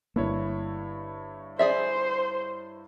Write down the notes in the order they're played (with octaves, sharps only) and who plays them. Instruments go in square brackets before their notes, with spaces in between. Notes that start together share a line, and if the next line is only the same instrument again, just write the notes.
[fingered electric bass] G1 A#3 [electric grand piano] G2 E4 C#5
[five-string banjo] G#4 D5 E5 [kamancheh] C5